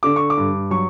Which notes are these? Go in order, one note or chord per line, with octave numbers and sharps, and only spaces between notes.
D3 D6
C#6
D6
G2
F#3 C#6